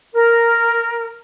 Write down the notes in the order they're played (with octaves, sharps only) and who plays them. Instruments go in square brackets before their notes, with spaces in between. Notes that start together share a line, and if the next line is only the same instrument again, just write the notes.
[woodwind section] A#4